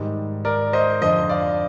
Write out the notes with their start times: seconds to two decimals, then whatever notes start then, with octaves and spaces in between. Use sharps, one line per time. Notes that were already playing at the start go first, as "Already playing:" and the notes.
Already playing: G#2 D#3 G3
0.45 A#4 D5
0.73 C5 D#5
1.02 F2 D3 F3 C5 D#5
1.29 D5 F5